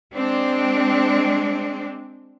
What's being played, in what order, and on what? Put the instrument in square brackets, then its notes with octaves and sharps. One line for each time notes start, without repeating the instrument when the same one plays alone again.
[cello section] G#3 C4 D4